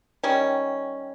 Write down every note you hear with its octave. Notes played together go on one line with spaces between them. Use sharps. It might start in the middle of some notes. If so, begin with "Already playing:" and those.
D#3 G3 C#4